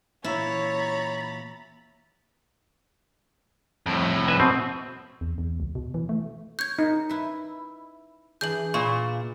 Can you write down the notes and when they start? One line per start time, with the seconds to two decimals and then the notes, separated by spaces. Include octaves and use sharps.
0.24 A#2 E3 E4 C#5 A#5 B5 A6
3.86 F2 A2
4.28 B4 E5 G#5
4.40 B2 C4
5.21 E2
5.38 E2
5.60 C#2
5.75 B2
5.94 E3
6.09 A3
6.59 C#5 G6 G#6
6.79 D#4
7.09 E4 B4
8.41 E3 D4 G#4 G6 F#7
8.74 A#2 B4 C#6